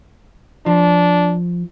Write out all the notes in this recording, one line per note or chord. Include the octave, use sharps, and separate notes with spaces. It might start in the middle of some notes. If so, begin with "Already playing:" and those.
F3 D4